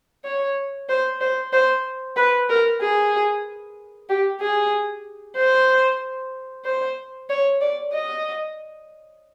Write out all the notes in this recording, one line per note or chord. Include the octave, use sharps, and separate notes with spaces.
C#5
C5
C5
C5
B4
A#4
G#4
G4
G#4
C5
C5
C#5
D5
D#5